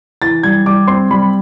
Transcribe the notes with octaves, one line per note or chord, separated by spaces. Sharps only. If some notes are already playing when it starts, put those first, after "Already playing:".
E3 A6
G3 G#6
G3 D6
C4 C6
G3 B5